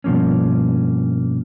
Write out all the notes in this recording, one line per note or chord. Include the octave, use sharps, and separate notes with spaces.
G2 B2 F3 A#3 C#4